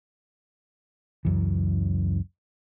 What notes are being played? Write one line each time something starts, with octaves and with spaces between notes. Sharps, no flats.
C#2 F#2 E3